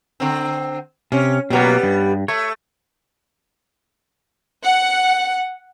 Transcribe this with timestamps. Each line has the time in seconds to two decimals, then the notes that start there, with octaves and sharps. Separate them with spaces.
0.20 D3 C4
1.12 C3 C#4
1.50 B2 F#3 G3 A#3 B3
1.83 G2
2.28 A3 C#5
4.64 F#5